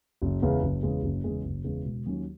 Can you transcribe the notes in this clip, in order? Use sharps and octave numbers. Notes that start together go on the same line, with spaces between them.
F#1
E2 C#3 G#3
F#1
E2 C#3 G#3
F#1
E2 C#3 G#3
F#1
E2 C#3 G#3
E1
D#2 D#3 F#3 C#4